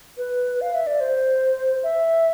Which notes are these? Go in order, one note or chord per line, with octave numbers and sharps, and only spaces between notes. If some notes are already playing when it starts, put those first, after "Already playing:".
B4
F5
E5
D5
C5
E5